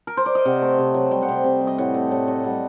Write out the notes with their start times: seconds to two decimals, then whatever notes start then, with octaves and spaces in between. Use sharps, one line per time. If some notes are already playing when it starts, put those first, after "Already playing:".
0.07 A#4
0.17 C5
0.26 D5
0.35 D#5
0.46 C3 F#5
0.62 A3
0.78 C3
0.94 F#3
1.11 G3 G5
1.23 F#5
1.28 C3 G5
1.44 C3
1.61 G3
1.67 D#5
1.78 A2 F#5
1.94 A3 F#5
2.11 A2 A4
2.28 F#3 D#5
2.44 G3 F#5